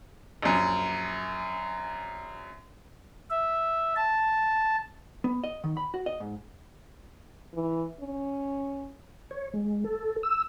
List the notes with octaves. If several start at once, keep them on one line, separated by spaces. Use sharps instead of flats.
A#1 F#2
E5
A5
B3
D#5
D#3
B5
F#4
D#5
G#2
E3
C#4
C#5
G#3
A4
E6